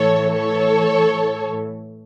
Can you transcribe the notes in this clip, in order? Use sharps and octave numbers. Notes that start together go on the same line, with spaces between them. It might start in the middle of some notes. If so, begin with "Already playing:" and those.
Already playing: A2 E3 A4 C#5
A4 C#5